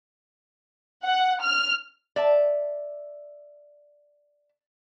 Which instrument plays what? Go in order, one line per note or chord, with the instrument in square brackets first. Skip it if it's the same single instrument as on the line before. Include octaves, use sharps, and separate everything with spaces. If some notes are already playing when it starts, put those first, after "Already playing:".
[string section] F#5
F6
[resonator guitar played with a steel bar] D5 E5 A5